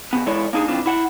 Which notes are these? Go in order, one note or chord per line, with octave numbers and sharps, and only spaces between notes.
C#3 B3
E3 G#3 E4 A4 C#5 D5
A#3 D4 D#4 G#4
D2 D#3 E3 C4 D4 F4
E4 F#5